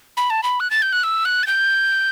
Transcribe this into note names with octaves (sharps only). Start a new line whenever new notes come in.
B5
A5
B5
F#6
A6
G6
F#6
E6
F#6
A6
G6